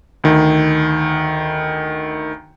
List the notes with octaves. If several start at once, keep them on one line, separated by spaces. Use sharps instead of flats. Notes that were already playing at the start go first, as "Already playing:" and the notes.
D2 D#3